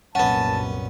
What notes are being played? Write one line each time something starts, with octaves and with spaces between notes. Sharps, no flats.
C2 F#2 A#2 B3 C#4 F#5 A5